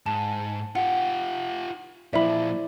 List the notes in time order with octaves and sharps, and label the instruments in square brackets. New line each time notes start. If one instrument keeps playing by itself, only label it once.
[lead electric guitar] G#2 [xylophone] A5
[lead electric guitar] F4 G4 [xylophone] F#5
[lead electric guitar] A#2 F3 [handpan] E4 C5 D5 [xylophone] E5 B5